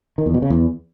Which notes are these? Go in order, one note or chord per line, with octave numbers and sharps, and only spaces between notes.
D#3
E2
B2
C#3
E2